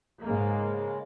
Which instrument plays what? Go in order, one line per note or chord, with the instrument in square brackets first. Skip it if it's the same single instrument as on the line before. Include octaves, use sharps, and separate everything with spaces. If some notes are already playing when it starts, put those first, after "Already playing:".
[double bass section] G#2 A#3 [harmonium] C#3 G#3